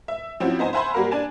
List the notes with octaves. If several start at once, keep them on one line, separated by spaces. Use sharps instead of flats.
E5
F3 C4 C#4 E4 F#4
B3 D#4 C5 G#5
C5 E5 F#5 G#5 B5 C6
G3 A#3 F#4 A#4 F5
D4 G#5 A5